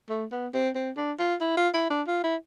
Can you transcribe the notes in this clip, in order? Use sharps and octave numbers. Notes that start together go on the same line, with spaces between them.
A3
B3
C4
C4
D4
F4
E4
F4
E4
D4
F4
E4